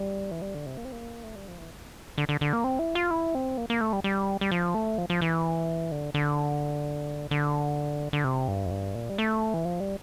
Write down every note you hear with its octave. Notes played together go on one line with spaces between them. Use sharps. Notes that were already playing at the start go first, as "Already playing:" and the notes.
Already playing: G3
E3
G3
D3
C3
A#3
C4
A#3
A3
G3
F3
E3
D3
D3
D3
A#3
C4
E4
F4
E4
C4
A#3
A#3
A3
G3
G3
G3
F3
A3
F3
F3
E3
D3
D3
D3
D3
C3
G2
F2
G2
A#2
G3
A3
E3
F3
G3